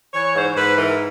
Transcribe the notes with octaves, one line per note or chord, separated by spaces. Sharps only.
E3 C#5
G#2 C5
G#2 B4
E3 A#4